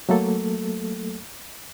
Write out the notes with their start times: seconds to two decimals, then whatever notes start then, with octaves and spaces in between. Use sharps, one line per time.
0.09 F#3 A3 A#3 A4